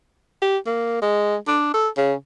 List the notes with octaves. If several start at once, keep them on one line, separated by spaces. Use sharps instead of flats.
G4
A#3
G#3
D4
A4
C#3